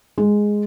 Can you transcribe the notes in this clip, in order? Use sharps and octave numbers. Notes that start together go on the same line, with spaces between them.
G#3